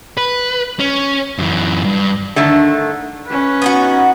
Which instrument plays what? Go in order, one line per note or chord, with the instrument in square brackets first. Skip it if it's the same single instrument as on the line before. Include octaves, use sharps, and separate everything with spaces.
[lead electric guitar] B4
C#4
F#2 E3
G2
[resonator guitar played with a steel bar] D3 D#3 A3
[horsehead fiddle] C#4 B4
[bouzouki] B3 D#4 F#4